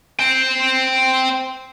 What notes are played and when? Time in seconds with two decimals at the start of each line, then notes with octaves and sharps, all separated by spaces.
0.20 C5 G5